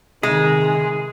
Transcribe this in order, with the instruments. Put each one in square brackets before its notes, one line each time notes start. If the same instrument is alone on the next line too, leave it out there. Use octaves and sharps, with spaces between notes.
[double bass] C3 D#3 [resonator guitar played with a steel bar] G#3 [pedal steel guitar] G#4